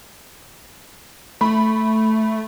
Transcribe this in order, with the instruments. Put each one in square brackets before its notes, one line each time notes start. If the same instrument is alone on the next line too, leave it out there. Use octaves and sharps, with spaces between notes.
[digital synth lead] A3 [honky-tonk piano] B5